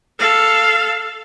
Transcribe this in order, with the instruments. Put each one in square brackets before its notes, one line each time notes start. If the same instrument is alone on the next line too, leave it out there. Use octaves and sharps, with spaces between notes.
[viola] A4 F5